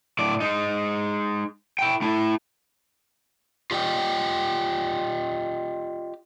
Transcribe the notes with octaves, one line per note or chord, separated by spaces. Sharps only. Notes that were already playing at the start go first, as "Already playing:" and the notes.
A2 D5
G#3 D#4
E4 G5
A3 E4
F4 G4 D5 D#5 G5